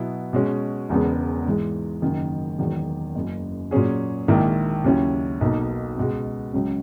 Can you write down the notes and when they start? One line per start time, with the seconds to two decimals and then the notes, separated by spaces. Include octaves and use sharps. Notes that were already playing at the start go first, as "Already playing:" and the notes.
Already playing: B2 F#3 B3 E4
0.33 B2 G#3 C#4
0.89 E1 E2 C#3 G#3 B3
1.45 G#2 E3 G#3
2.02 F#1 F#2 D#3 F#3
2.59 E1 E2 D#3 F#3
3.15 F#1 F#2 C#3
3.71 A#2 F#3 C#4 G#4
4.28 A#1 G#2 D#3 A#3 E4
4.84 D#2 C#3 F#3 C#4 E4
5.41 B1 B2 A#3 D#4
5.97 C#2 B2 G#3
6.54 C#2 C#3 F#3 C#4